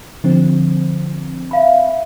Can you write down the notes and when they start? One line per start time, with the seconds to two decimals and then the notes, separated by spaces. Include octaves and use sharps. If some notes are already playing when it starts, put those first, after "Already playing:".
0.24 D3 F3 C4
1.51 E5 F5 B5